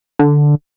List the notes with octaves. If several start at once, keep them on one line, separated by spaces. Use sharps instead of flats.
D3